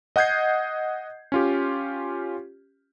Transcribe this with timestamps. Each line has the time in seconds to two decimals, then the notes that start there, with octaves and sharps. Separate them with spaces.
0.16 D#5 F#5 D#6 G6 G#6 C7
1.32 C#4 F4 G4